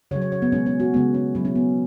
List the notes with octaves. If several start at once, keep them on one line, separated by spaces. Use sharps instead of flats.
C#3 F#3 C#5
C#5
C#5
B3
B2 G#3 C#4
C#4
F#4
C#3 G#3 B3
C#4
B2 F#3 E4
C#4
B3